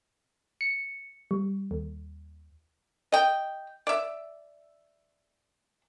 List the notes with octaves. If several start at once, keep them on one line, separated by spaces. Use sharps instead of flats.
C#7
G3
D#2
D#5 G5
D5 E5